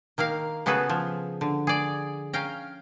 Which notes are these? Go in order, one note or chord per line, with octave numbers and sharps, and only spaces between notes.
D#3 A#3 A#4 F5
C#3 B3 F#4 G#4 A4 B4
F3
D3
G#4 D5
C#4 F5 G5 A#5